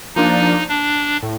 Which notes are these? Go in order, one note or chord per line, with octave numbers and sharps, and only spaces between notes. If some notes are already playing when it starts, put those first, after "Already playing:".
F3 A#3 D4 D#4
D4
A2